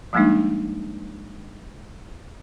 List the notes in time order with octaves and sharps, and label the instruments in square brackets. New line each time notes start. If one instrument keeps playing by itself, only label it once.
[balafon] F3 G3 G#3 A#3 D4 D#4